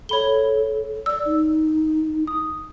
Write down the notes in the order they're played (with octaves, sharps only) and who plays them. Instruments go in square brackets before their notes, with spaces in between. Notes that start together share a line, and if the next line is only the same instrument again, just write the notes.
[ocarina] A4 [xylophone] C#5 B5 G7
[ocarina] D5 [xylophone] E6
[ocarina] D#4
[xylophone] D#6